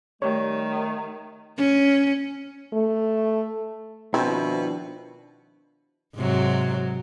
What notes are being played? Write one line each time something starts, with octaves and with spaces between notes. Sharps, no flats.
D#3 G3 A3 G4 C#5
C#4
A3
B2 D#3 F3 C4 D4 E4
G#2 C3 F#3